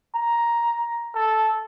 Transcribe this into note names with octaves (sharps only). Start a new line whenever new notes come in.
A#5
A4